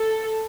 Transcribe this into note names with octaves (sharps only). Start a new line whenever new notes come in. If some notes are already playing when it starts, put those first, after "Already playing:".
Already playing: A4